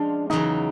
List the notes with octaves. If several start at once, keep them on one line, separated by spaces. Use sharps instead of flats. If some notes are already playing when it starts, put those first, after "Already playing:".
Already playing: F3 G#3 C#4 D4 F4
E2 C#3 F#3 D#4